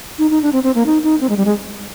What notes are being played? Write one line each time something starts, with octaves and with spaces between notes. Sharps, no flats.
D#4
D#4
D4
C4
C4
A#3
D#4
D#4
C4
G#3
G3
G#3